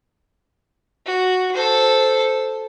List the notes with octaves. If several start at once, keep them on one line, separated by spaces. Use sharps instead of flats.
F#4
A4 C5